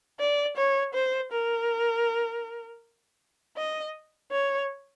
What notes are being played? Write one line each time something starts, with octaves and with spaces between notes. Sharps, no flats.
D5
C#5
C5
A#4
D#5
C#5